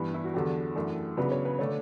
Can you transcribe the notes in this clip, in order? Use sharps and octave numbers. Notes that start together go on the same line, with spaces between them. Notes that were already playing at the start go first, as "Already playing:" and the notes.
Already playing: G2 E3 B3
E4
F#4
E2 D3 F#3 G4
F#2 E3 A3 D4
C#3 F#3 B3 D4 B4
C#5
B4
D3 A3 D4 C#5